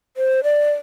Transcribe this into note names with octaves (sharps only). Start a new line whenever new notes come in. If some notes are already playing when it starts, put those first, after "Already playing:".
C5
D5